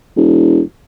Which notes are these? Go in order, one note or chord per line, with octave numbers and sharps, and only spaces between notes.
E1